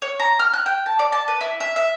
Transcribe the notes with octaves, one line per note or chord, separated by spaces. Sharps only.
C#5
A#5
F6
F#6
G5
A5
D5
A5
B4
E4
E5
E5